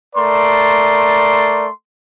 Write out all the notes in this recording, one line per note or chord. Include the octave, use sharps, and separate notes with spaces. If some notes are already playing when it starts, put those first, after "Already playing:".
A3 A#4 D5 C6